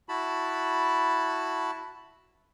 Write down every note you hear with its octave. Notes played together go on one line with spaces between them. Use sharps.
E4 F#4 A5 B5